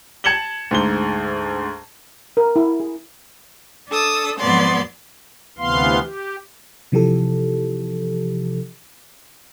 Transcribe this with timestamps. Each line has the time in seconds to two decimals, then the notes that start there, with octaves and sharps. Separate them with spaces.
0.24 A5 G#6 C#7 E7 F#7 G7
0.71 D2 G#2 G7
2.37 A#4
2.56 E4
2.80 G#4
3.89 D4 A4 D#6 E6
4.39 F2 G#2 F#3 B3 D5 C6
5.58 D2 C3 E3 B3 F5 C6
6.03 G4
6.92 C3 E3 F3 G4 A4